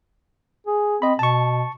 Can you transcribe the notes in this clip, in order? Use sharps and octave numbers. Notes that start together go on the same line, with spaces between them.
G#4
C4 D#5 B5
B2 A5 C#6